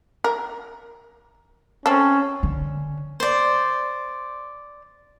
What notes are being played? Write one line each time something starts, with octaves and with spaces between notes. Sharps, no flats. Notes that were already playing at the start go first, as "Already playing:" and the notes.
A#4
C4 C#4 A4
D3
C5 D5